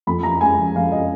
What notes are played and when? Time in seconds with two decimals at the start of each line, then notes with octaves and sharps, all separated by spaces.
0.07 F2 B5
0.23 F2 A#5
0.41 G#3 G#5
0.58 F3
0.76 F2 F5
0.92 D#5